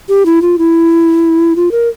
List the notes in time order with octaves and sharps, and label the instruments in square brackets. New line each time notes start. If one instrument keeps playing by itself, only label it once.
[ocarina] G4
E4
F4
E4
F4
A#4